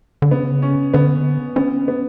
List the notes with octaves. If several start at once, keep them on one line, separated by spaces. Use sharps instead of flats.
D3
C#3 B3
C#4
D3 B3
B3 C#4
B3